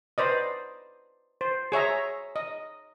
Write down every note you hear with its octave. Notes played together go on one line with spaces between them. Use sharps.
B4 C5 D5 D#5
C5
G#4 C#5 E5 A#5
D#5